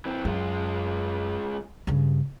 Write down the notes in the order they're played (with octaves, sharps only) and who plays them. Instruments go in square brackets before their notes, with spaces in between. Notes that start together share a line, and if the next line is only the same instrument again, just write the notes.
[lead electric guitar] E3 C4
[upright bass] F#2 [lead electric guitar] G#3 F4
[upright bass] G2 C#3